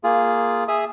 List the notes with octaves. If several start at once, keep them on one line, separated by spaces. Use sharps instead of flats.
A#3 F4 G#4
G#4 E5 D#6